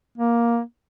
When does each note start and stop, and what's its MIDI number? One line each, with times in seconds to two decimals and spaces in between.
0.18 0.60 58